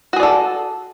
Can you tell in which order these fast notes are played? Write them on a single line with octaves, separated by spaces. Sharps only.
F#4 G#4 D5 A4